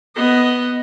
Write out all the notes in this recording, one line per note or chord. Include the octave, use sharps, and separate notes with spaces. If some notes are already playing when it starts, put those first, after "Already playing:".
B3 D#5